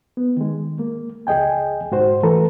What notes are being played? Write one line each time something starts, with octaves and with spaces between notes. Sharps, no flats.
B3
D#3 G#3
A#3
C#2 G#4 D#5 G5 G#5
G#2 F#4 C5
E3 A3 A4 B4 A#5